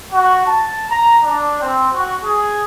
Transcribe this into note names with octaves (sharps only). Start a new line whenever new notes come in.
F#4
A5
A#5
D4
C4
F#4
G#4